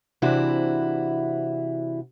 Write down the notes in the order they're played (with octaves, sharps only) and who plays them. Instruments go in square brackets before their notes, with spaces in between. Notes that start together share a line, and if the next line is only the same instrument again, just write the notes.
[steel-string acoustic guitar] C3 E3 C4 D4 E4 F#4